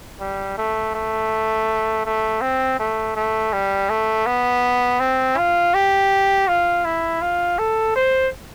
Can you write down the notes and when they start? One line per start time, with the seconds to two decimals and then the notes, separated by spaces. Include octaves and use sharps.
0.20 G3
0.58 A3
0.95 A3
2.06 A3
2.41 C4
2.79 A3
3.16 A3
3.53 G3
3.90 A3
4.26 B3
5.00 C4
5.37 F4
5.74 G4
6.48 F4
6.85 E4
7.21 F4
7.59 A4
7.96 C5